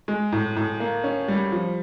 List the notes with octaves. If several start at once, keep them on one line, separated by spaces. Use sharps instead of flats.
G#3
A2
A2
A#3
C#4
G3
F3